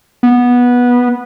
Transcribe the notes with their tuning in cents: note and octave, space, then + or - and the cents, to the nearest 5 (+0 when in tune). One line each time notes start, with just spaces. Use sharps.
B3 -15